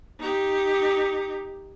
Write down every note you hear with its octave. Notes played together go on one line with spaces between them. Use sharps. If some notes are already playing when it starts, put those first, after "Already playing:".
D#4 G4